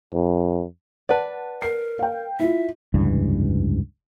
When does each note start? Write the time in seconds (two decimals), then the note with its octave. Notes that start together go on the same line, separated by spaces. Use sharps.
0.14 F2
1.09 B4 D5 F#5 A5
1.62 A#4 C7
1.99 F5 G5
2.40 E4 F4 E5
2.94 F1 C#2 G2 E3